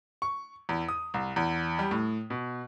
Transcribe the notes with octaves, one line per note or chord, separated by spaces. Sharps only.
C#6
E2
D#6
C2
E2
G3
A2
B2